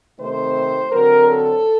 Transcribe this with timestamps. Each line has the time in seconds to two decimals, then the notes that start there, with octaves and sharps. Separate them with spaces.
0.18 C3 D#3 A3 C4 C5
0.91 D3 F#3 C4 A#4
1.28 A4